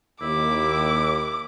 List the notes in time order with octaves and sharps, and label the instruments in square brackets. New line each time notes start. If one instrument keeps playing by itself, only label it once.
[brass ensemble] D#2 [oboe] E4 [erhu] D6